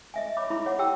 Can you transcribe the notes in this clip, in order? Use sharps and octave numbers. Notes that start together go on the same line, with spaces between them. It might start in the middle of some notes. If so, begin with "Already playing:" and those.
D#5 E5 G#5
C#5 B5 D6
E4 B5 D6
C#5 F#5
G4 G5 A5 E6